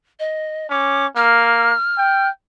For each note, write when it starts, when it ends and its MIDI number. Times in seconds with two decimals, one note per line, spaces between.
0.20 0.69 75
0.70 1.06 61
0.70 1.07 86
1.16 1.73 58
1.16 2.27 89
1.98 2.30 79